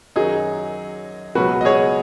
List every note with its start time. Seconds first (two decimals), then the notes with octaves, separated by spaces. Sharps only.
0.16 F#2 D#3 F#3 D#4 G#4
1.35 C#2 B2 F#3 F#4 B4
1.61 D#5
1.65 G#4 C#5